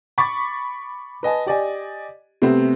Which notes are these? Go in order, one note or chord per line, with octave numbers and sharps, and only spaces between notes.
B5 C#6 D6 A6 B6
B4 D#5 G#5 A5
G4 D5 D#5 G#5
C3 A3 B3 C4